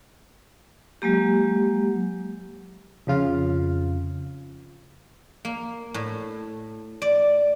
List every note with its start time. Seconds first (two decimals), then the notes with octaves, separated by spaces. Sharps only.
1.02 F#3 G#3 A#3 G4
3.07 F2 C#3 F4 F5
5.45 A#3
5.94 A2
7.02 D5